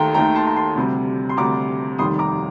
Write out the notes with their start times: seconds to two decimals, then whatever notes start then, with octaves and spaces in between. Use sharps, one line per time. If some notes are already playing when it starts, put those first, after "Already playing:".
Already playing: D#2 D#3 A3 G5 A#5 C6
0.14 D#2 D#3 A3 G5 A#5
0.35 A5 C6
0.46 A#5
0.56 A5 C6
0.76 D2 C3 G3
1.29 C6
1.37 D2 C3 G3 A#5 D6
1.98 F1 D#2 D#3 G3 C6 D#6
2.19 A#5 D6